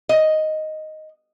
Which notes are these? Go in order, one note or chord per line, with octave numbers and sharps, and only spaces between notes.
D#5